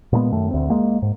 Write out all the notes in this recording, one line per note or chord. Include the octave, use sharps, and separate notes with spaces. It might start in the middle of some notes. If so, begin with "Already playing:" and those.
A#2 G#3 A#3 B3
F#2 D#3 A3
D2 C4
G#3 A#3
G#2